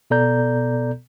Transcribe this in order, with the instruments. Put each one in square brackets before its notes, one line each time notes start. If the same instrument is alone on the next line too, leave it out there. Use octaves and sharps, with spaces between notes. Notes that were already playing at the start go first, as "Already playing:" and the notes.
[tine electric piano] B2 B3 A4 D5 A#5 G6